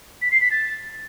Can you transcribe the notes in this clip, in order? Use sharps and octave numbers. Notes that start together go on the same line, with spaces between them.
B6
C7
B6
A6